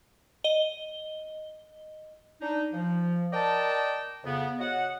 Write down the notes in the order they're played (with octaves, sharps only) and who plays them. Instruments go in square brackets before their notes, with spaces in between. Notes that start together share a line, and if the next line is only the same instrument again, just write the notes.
[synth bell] D#5 G7
[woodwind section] D4 D#4
F3
A#4 D5 D#5 G5 A5
F2 C#3 B3
F#4 C#5 D#5 F#5